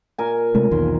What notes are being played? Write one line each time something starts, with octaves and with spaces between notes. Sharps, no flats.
A#2 A#4 G#5
C3 G#3 A3
B1 E2 D#3 C6